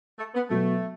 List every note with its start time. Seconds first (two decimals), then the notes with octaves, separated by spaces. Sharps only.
0.19 A3
0.35 B3
0.49 B2 F#3 A3 B3